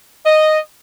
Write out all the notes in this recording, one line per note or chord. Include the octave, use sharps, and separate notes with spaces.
D#5